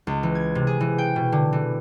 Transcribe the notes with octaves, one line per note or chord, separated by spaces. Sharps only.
C#2
E3
G#6
C3
G#4
E3
G5
B2
D3
E3